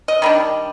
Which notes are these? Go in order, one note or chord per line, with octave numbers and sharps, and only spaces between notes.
D#5
D#3 G3 D4